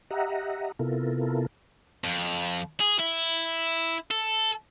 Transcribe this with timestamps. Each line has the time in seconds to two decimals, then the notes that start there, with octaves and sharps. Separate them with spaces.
0.10 G4 D#5 E5 F#5 A#5
0.79 C3 B3 E4 F4 A4 A#4
2.04 F2
2.80 G#4
2.99 E4
4.11 A4